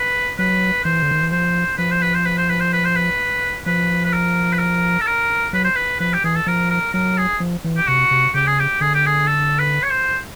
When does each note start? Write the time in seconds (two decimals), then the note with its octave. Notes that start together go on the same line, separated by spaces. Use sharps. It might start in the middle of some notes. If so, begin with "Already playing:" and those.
Already playing: B4
0.39 F#3 B4
0.84 E3 C5
1.02 D3
1.11 D#3
1.22 E3
1.32 F3 C5
1.78 F3 B4
1.91 C5
2.02 B4
2.14 C5
2.25 B4
2.38 C5
2.49 B4
2.60 C5
2.73 B4
2.85 C5
2.96 B4
3.66 F3 B4
4.05 B4
4.13 A#4
4.53 B4
4.59 A#4
5.01 A4
5.07 A#4
5.53 F#3 B4
5.64 C5
5.75 B4
6.00 F3 B4
6.14 G4
6.24 E3 G#4
6.36 A4
6.47 F3 A#4
6.71 A#4
6.94 F#3 A#4
7.18 G#4
7.40 F3
7.64 E3
7.77 G4
7.87 C3 F#4
8.11 C3
8.34 C#3 G4
8.47 G#4
8.59 G4
8.81 D3 G#4
8.94 G4
9.06 G#4
9.28 A4
9.59 B4
9.83 C#5
9.90 C5